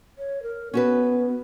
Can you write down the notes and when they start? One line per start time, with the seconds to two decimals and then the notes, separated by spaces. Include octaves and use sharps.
0.18 C#5
0.42 A#4
0.73 B3 C#4 F#4 B4